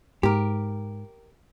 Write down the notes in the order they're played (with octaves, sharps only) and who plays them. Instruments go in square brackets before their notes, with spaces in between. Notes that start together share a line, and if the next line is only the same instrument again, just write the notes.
[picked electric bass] G#2 [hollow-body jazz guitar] G4 A#4